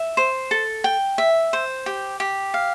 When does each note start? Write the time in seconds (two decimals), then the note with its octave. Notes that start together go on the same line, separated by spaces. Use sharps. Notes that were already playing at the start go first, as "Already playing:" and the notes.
Already playing: E5
0.17 C5
0.51 A4
0.84 G5
1.18 E5
1.53 C5
1.86 G4
2.20 G4
2.54 F5